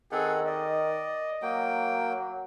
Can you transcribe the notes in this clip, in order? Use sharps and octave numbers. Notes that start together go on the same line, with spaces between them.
D#3 C4 G#4 A4 F#5
D5 D#5
F#3 A#3 G5